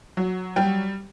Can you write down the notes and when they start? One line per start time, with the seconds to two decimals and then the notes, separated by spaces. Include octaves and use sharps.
0.17 F#3
0.56 G3 G5